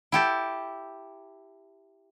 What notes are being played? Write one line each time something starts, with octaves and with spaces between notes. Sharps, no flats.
E4 G4 A4